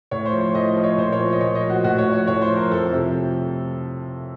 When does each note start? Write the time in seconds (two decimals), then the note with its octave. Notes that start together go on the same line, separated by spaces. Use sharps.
0.11 A2 C#5
0.25 C5
0.33 F3
0.41 C#5
0.54 A2 D#5
0.69 D#5
0.77 F3
0.84 C#5
0.97 A#2 C5
1.12 C#5
1.19 F3
1.32 D#5
1.41 A#2 C#5
1.55 D#5
1.63 F3
1.70 F#4
1.84 A2 F#4
1.98 C#5
2.07 F3
2.13 C#5
2.27 A2 C#5
2.42 C5
2.50 F3
2.57 A#4
2.71 F2 A4
2.92 C3 F3